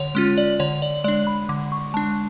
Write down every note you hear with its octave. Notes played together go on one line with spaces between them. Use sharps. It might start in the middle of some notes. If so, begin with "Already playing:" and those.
Already playing: D3 C#5
G#3 C#4 F4
D5
D3 C#5
D5
G#3 D4 D5
B5
D3 D6
C#6
G#3 D4 A5